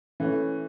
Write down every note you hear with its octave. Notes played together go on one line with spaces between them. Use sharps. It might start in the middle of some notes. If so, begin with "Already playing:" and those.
E3 A3 C#4